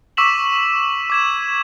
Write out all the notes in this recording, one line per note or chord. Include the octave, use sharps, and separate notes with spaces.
C#6 D6 E6 B6 E7 F#7
D6 G#6 E7